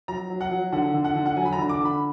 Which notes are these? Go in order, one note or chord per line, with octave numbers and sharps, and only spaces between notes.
F#3 A#5
F#3
F#5
F#3
D3 F#5
D3
F#5
D3
F#5
F#3 G#5
B5
A#5
D3
D6
D3
B5